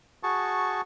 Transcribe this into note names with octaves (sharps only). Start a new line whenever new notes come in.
F#4 G#4 A5 C#6